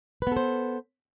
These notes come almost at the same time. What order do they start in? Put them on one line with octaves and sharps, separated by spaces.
B4 B3 A4 C5